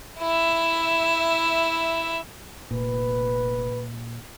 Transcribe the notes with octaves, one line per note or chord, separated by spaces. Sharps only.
E4 E5
F1 A#2 B4